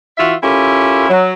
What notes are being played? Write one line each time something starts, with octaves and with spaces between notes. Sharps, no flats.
E3 F4 F#4 E5
C#4 E4 F4 G4 A4 A#4
F#3